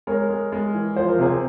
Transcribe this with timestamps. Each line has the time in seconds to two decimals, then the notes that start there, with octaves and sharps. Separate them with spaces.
0.07 G#3 A#4 C#5
0.30 G#3
0.52 G#3
0.74 E3
0.96 F3 C5
1.09 A#4
1.19 C3 G#4 C5